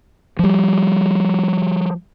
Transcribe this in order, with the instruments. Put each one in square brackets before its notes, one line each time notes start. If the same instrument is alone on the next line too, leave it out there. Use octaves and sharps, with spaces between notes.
[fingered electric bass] F3 G3